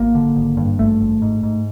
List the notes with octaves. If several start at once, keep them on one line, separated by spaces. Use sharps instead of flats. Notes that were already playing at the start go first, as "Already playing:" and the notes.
Already playing: G#1 A#3
D3
G#1
G2
G#1 A3
G#1
G#2
G#2